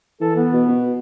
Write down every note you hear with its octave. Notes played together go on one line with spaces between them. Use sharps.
E3 A4
B3
B2
B2